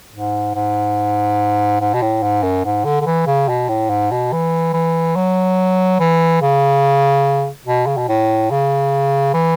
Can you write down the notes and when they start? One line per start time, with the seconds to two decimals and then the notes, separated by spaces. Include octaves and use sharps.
0.13 G#2
0.55 G#2
1.81 G#2
1.94 B2
2.02 A2
2.23 G#2
2.43 F#2
2.65 G#2
2.85 D3
3.02 D3
3.06 E3
3.27 C#3
3.49 B2
3.69 A2
3.90 G#2
4.11 B2
4.32 E3
4.73 E3
5.16 F#3
6.00 E3
6.42 C#3
7.66 B2
7.87 C#3
7.97 B2
8.09 A2
8.51 C#3
9.34 E3